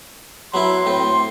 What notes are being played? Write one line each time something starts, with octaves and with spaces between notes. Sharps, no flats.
F#3 B3 E4 C6
A2 C4